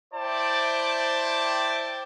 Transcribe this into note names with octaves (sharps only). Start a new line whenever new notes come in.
E4 C5 D5 G5 A5